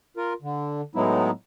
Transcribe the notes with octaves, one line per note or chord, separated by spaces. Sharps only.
F4 A#4
D3
A2 F#3 G#3 B3 D#4 E4